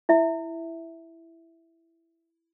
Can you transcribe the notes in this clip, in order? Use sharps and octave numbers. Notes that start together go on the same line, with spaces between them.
E4 E5